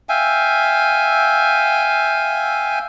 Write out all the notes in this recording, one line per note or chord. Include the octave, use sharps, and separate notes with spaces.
E5 F5 G5 G#5